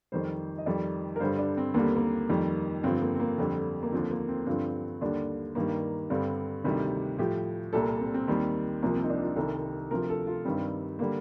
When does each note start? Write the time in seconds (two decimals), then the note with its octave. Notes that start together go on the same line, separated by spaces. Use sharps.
0.12 F2 D#3 G3 C5
0.58 D#5
0.66 F2 D#3 G3 D5
1.16 A#4
1.20 G2 D3 G3 C5
1.39 D4
1.57 C4
1.74 D#2 D3 G3 A#3
1.85 C4
1.96 A#3
2.29 F2 D#3 G3
2.83 G2 D3 F3 C4
3.01 A#3
3.15 C4
3.20 A#3
3.38 F2 D3 G3 C4
3.83 A#3
3.92 D#2 D3 F3 C4
4.11 A#3
4.28 C4
4.46 G2 D3 F3 C4
5.01 D#2 D3 G3 D4
5.55 G2 D#3 G3 A#3
6.10 G2 D3 G3 C4
6.64 D2 C3 D#3 G3
7.18 A2 F3 G4
7.73 C2 A#2 G3 A4
8.01 C4
8.14 C4
8.28 D#2 D#3 G3
8.82 C2 C3 F3 A#3
8.96 C4
9.04 D#4
9.10 D4
9.23 F4
9.36 C2 C3 D#3 G3 A4
9.91 D2 C3 F3 A#4
10.10 A4
10.27 F4
10.45 G2 D#3 G3 C4
10.99 D3 G3 A#3